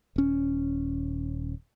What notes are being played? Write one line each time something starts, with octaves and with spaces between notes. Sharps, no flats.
D#1 C#4